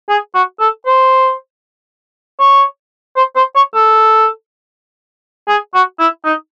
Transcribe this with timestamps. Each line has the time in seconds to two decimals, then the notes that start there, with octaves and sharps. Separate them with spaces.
0.09 G#4
0.34 F#4
0.60 A4
0.86 C5
2.39 C#5
3.16 C5
3.36 C5
3.55 C#5
3.74 A4
5.48 G#4
5.74 F#4
5.99 E4
6.24 D#4